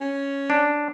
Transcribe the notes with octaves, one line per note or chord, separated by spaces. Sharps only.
C#4
D4